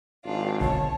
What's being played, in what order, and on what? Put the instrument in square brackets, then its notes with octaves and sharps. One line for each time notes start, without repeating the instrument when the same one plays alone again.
[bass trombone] G#1 [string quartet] D4 F4
[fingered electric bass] F#1 B1 D3 [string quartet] C#5 [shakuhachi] A5